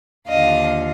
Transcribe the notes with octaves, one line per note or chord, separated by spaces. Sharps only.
D#2 D3 F3 D#5 F5